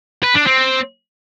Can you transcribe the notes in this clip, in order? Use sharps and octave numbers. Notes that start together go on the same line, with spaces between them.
B4
D4
C4